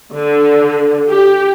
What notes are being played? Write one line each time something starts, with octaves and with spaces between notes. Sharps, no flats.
D3
G4